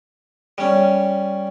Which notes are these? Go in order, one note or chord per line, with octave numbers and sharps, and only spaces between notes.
G3 C#4